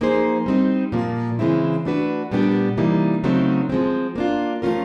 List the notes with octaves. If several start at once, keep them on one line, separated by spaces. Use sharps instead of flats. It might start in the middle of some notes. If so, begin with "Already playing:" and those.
F3 A#3 D#4 G#4 C5
G3 C4 D#4
A#2 F3 A#3
C#3 E3 G#3 C4 E4
A3 D4 F#4 B4
A#2 G3 B3 D4 G4
C3 E3 G3 A#3 D#4
C#3 F#3 A3 C4 D#4
F3 G#3 C4
A#3 D4 F4
F3 A3 C#4 F4 A#4